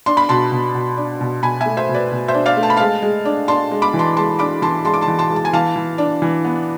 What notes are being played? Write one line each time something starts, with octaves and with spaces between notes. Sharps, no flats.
D4 C6
B5
B2 A5 C6
B2
B2
D4
B2
B2 G#5 B5
E5 G#5
A3
C5 E5
B2
B4 D5
B2
C5 E5
D4
D5 F5
A3
A5
B5
G#3 F5 A5
G#3
D4
D4 A5 C6
G#3
B5 D6
E3
A5 C6
G#3 A5 C6
D4 B5 D6
E3 A5 C6
G#3 A5 C6
D6
A5 C6
E3
A5 C6
G#3
A5
G#5
E3 F5 A5
E3
D4
E3
B3